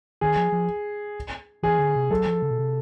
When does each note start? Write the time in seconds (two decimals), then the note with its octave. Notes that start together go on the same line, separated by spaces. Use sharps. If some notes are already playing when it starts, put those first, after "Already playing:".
0.21 D#3 G#4
0.37 F3
0.52 F3
1.63 E3 G#4
1.78 D3
1.95 C3
2.10 F#3 A4
2.26 F3
2.42 C#3
2.50 B2
2.59 C3